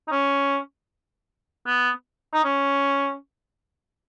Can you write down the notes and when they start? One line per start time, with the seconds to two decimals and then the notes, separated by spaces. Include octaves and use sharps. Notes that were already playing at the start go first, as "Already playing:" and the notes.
0.07 D#4
0.11 C#4
1.66 B3
2.33 D#4
2.44 C#4